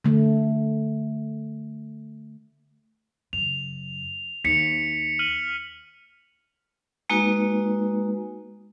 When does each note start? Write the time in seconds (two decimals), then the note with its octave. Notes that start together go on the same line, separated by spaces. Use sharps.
0.05 D3 A3
3.33 F#2 C#3 F7
4.45 D#2 B6 C#7 F7
5.19 F6 D#7 F#7
7.10 G#3 A#3 D#4 F#4 B4